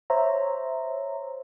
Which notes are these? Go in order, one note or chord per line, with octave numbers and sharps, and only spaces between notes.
C5 C#5 E5 A#5